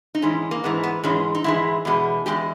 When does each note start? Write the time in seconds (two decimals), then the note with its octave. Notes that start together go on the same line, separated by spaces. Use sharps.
0.15 D#4
0.22 G#2 E3 G#3 C#4
0.51 A#3
0.64 G#2 E3 G#3 B3
0.84 B3
1.04 G#2 E3 G#3 C#4
1.35 D#4
1.44 G#2 E3 G#3 E4
1.85 E2 B2 G#3
2.26 E2 B2 G#3 G4